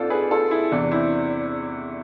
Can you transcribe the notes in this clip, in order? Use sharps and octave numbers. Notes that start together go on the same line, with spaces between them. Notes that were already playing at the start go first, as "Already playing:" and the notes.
Already playing: G#2 C4 D4 F4 A4
G#4 B4
F4 A4
E4 G#4
E2 C3 E3 D4
C4 E4